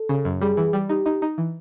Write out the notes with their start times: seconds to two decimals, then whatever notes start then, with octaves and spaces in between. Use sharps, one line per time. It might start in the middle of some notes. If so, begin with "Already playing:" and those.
Already playing: A4
0.09 C#3
0.25 F#2
0.41 G3 G#4
0.57 E3
0.73 G3
0.89 D#4 G4
1.06 D#4
1.22 D#4
1.38 E3